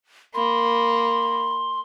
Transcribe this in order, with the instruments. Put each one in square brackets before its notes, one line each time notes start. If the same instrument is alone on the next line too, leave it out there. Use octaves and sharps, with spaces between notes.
[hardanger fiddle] A#3 [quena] B5 [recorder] C6